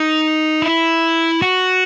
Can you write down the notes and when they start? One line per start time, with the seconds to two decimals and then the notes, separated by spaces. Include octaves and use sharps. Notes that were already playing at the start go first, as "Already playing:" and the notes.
Already playing: D#4
0.62 E4
1.42 F#4